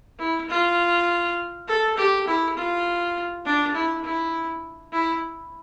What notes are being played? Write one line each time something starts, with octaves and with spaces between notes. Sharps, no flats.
E4
F4
A4
G4
E4
F4
D4
E4
E4
E4